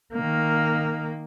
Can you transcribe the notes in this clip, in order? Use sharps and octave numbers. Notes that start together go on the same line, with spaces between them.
D#3 A#3